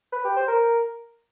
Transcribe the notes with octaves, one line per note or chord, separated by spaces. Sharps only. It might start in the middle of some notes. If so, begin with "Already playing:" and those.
B4
G4
C5
A#4